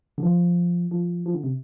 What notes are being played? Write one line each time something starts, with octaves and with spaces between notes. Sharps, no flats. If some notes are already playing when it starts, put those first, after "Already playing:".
D3
F3
F3
F3
D3
C3